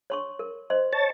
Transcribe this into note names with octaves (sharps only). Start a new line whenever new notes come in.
C#5 C6 C#6
A#4
C5 D#5 C6
C#5 A5